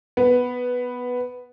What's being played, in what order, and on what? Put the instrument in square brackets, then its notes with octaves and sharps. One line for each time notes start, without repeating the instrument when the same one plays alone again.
[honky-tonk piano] B3